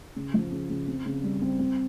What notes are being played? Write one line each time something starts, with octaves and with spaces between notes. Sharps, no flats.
C#3
F3
C#3
C#3
C4
C#3
G3
C4
C4